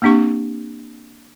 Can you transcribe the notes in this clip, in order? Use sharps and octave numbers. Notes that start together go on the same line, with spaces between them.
A#3 C4 D4 G4 C#6